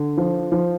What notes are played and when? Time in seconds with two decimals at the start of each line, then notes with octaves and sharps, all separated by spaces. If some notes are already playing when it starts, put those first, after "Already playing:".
Already playing: D3
0.17 F3
0.52 F3